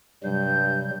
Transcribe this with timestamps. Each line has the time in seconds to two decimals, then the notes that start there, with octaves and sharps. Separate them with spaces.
0.24 G2 C3 F#3 G3 G6